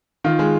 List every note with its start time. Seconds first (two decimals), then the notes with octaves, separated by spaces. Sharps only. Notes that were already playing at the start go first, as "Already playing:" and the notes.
0.24 D#3 F4
0.39 G#3